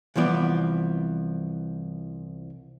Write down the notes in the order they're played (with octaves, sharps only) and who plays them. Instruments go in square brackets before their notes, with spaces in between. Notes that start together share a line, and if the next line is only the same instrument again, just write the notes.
[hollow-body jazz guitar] C2 E3 F3 B3 D5